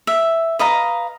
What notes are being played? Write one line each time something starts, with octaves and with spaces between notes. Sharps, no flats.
E5
B4 D#5 F5 A#5